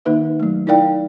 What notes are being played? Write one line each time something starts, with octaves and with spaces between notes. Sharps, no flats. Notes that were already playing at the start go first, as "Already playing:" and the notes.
D#3 A#3 D#4 B4 E5
F#3 A3
D#4 E4 A#4 D5 F5 G5